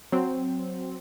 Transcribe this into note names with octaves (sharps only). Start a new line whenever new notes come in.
F#3 C4